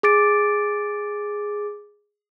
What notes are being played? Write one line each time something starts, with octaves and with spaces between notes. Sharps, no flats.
G#4 D6 A6 D7